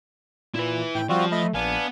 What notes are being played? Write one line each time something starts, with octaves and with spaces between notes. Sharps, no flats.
A#2 E4 B4
A2 G5
F3 G3 C4 F4 F#4
A3 D#5 B5
A#1 B3 D4 F5 G#5